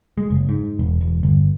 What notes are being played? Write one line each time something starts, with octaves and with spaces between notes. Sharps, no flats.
G#3
F#1
G#2
E1
E1
G1